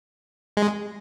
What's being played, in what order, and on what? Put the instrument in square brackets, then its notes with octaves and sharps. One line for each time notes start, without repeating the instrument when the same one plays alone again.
[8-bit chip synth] G#3